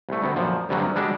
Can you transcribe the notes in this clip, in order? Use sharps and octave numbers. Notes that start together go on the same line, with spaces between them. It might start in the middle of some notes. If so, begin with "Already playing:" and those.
C2 A3
D2 B3 C4
F#2 A#2 F3
D2 G2 C3 F#3 C#4
G3 G#3 D4 F#4 G4 A4